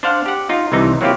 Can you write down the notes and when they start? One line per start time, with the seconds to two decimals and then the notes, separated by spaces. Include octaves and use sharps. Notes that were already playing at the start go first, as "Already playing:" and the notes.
0.03 D4 C5 F5 F#5
0.26 G4 F#5
0.49 D#4 F4
0.72 C2 C3 E3 D#4
1.01 F#3 A#3 C4 E4 F4 G4